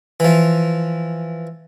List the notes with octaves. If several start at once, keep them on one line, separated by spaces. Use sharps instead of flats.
E3 F3